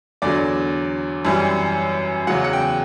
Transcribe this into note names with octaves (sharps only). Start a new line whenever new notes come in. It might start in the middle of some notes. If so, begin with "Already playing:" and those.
E2 D3 F#3 D5
F#2 E3 G3
E2 C#3 F#3 F#5
F#5
G5